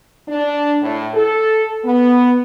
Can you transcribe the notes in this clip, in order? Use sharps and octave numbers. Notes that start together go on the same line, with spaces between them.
D4
A2
A4
B3